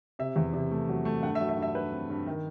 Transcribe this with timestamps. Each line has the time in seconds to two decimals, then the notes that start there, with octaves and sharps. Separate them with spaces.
0.19 C3 E5
0.36 E2
0.54 C3
0.71 A3
0.89 F#3
1.05 A3
1.23 G2 F#5
1.35 E5
1.41 F#3
1.49 E5
1.57 G2
1.62 E5
1.75 G2 B4
1.93 C4
2.10 G2
2.27 D#3